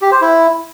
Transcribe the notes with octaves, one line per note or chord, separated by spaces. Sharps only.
G4
C5
E4